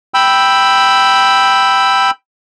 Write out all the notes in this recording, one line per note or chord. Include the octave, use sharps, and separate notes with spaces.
G5 B5 E6